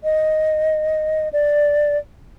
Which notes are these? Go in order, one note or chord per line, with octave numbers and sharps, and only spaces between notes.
D#5
D5